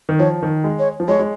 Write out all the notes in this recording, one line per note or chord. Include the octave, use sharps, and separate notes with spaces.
D#3
F3 C#5
D#3
G#3
C#5
F3
G#3 C#5
G#3